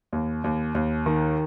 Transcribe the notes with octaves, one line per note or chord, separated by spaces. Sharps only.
D#2
D#2
D#2
D#3